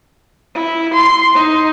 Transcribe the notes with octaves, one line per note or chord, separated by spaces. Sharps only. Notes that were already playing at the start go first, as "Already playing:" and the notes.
E4
C6
D#4